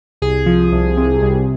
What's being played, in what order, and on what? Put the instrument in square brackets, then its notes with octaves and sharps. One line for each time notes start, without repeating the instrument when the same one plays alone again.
[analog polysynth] C2 G#4
F3
C2
C3
C2